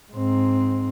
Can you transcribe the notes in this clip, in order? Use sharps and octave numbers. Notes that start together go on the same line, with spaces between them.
G#2 C4